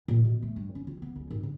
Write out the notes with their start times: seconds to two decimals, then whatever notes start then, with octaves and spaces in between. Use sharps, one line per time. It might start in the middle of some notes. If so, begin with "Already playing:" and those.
0.08 A#2
0.25 B2
0.43 A3
0.56 G2
0.75 C#4
0.87 F4
1.02 B3
1.16 C#2
1.31 G#1
1.43 D3